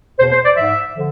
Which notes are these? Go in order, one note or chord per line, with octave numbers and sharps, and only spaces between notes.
E2 B2 C5
C5
D5
G#2 F3 E5
D3 F3